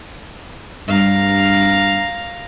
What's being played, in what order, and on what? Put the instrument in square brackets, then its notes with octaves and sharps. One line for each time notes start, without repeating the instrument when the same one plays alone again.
[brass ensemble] G2 [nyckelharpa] F5 A#5